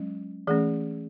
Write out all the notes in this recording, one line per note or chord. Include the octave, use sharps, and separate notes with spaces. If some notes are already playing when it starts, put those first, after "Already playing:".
Already playing: F#3 G#3 C#4
E3 A3 C#4 G#4